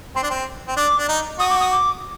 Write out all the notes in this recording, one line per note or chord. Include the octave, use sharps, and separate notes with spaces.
C4 C6
D4
C4
C4
D4 D6
D4
D#4
F#4 D#6
D6
D#6
D6